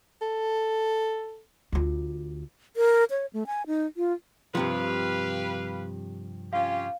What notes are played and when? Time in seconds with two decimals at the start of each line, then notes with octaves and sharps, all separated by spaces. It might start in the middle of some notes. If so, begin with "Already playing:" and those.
0.21 A4
1.72 D2 F4
2.76 A#4
3.10 C#5
3.33 A3
3.47 G#5
3.67 D#4
3.97 F4
4.55 G2 C3 F3 G4 B4 F5
6.53 C#4 F4 G4 F5